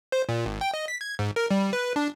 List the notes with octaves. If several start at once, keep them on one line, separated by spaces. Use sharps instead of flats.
C5
A#2
G#1
G5
D#5
B6
G#6
G#2
A#4
G3
B4
D4